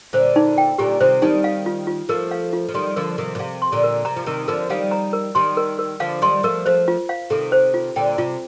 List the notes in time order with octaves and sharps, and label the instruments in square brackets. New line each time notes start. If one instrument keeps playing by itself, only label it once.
[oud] A#2 D3 [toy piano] C5
[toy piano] D#4
G5
[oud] A#2 D3 [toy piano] G4
[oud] C3 D#3 [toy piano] C5
[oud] D#3 G3 [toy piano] D#4
[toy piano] F5
F4
F4
[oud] F3 A3 [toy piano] A#4
[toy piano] F5
F4
[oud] F3
[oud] D#3 G3 [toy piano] C6
[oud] D3 F3 [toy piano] A#4
[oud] C3 D#3 [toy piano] A#4
[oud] A#2
[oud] C3 [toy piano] F5
[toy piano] C6
[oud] A#2 D3
[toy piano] A#4
[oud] C3 [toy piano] A#5
[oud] F3
[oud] C3 D#3 [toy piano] A#4
[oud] D3 F3 [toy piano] A#4
[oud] D#3 G3 [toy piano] F5
[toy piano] A#5
A#4
[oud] D#3 G3 [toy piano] C6
[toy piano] A#4
A#4
[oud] D3 F3 [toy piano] F5
[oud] D#3 G3 [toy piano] C6
[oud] F3 A3 [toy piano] A#4
[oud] F3 A3 [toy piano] C5
[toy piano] F4
F5
[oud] C3 D#3 [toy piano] A4
[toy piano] C5
F4
[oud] A#2 D3 [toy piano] G5
[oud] C3 [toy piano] F4